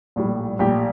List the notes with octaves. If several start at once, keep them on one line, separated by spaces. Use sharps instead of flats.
A#1 A2 G3
A#1 A2 G3 G4